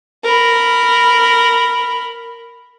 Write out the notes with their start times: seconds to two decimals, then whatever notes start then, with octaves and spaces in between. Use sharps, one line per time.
0.24 A#4 B5